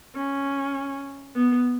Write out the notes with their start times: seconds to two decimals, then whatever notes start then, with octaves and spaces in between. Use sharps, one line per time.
0.15 C#4
1.35 B3